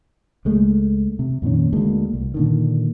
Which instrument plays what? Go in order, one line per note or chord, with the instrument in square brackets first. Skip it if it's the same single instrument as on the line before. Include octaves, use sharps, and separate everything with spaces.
[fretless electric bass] C#2 G#3 A3
C3
F2 A#2 D#3 C#4
D2 D3 G#3 A#3
C2
A#2 D3 D#3